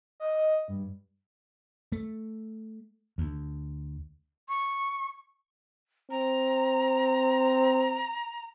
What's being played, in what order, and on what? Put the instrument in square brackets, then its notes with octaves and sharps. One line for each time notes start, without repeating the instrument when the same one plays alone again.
[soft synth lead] D#5
G2
[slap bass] A3
D2
[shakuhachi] C#6
[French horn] C4 [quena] A#5